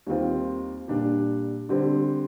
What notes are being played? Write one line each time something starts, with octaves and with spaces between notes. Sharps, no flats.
D#2 D#3 G3 C4 F4
A#2 G3 D4 G4
D3 G3 C4